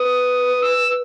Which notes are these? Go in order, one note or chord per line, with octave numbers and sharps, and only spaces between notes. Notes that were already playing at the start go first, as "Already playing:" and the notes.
Already playing: B4 D#6
E6